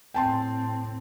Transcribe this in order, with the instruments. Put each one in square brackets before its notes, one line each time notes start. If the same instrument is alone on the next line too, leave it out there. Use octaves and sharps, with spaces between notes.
[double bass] A2 C4 [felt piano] G5 A5 C6